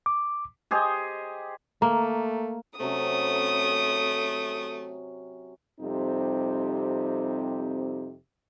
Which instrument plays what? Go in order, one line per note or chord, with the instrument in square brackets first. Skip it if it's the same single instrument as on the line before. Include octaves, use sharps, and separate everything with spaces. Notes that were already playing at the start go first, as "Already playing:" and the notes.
[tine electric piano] D6
[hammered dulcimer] G4 G#4 C5 D#5
[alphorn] A3 [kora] A#3 [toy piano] A#5
[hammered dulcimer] C3 F#3 C#4 [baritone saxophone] A3 [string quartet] D#6
[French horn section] F2 C3 G3 C4 D#4